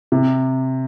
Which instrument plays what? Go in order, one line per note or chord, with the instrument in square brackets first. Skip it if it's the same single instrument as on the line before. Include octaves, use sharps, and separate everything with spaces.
[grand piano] C3